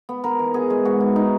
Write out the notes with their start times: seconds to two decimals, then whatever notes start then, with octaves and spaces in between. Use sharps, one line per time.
0.09 B3
0.24 B3 A#4
0.39 E3
0.54 B3 G#4
0.70 G#3
0.85 G#2 F#4
1.00 E3
1.16 D#4